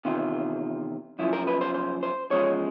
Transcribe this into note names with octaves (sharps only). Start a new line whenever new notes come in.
E2 C3 D#3 F4
F#2 C#3 F3 E4
A#4
B4
C5
C5
C5
E2 C#3 F3 G#3 C#5